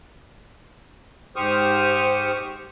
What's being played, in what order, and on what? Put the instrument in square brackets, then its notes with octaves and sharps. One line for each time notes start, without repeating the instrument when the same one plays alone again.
[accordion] G#2 G4 C5 C#6 D#6 F6